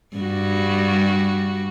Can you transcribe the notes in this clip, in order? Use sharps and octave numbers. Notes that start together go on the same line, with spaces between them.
G2 G3 F#4